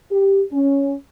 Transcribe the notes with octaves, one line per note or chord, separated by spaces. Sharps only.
G4
C#4